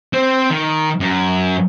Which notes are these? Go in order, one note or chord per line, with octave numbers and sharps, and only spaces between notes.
C4 C5
D#3
F#2